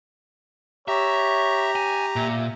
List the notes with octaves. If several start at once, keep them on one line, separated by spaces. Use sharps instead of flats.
G4 C#5 E5 A#5
G#5
A#2 E5